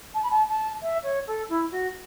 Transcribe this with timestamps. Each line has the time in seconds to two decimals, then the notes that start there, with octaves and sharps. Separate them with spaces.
0.14 A5
0.22 B5
0.30 A5
0.48 A5
0.81 E5
1.03 C#5
1.27 A4
1.49 E4
1.70 F#4